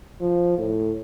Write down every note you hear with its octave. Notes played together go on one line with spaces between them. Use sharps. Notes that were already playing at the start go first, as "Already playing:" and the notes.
F3
A2